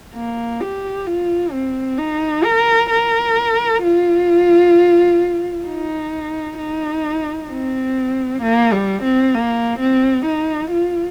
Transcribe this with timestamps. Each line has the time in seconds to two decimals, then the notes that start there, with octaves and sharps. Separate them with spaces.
0.15 A#3
0.60 G4
1.07 F4
1.52 C4
1.98 D#4
2.44 A#4
2.90 A#4
3.82 F4
5.66 D#4
6.58 D#4
7.50 C4
8.42 A#3
8.72 G3
9.03 C4
9.34 A#3
9.79 C4
10.25 D#4
10.71 F4